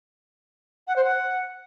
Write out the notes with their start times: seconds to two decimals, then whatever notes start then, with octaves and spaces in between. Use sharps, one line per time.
0.88 F#5
0.96 C5
1.04 F#5